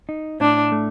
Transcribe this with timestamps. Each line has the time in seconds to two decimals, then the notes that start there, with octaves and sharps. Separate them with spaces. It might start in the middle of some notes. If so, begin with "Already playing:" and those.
0.09 D#4
0.40 A2 D4
0.72 A3